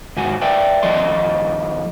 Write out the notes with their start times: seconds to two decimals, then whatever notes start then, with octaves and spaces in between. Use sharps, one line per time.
0.17 D#2 G#2 F#4 G#5
0.41 B4 D5 E5 G5
0.83 D#2 F3 A4 D#5 C6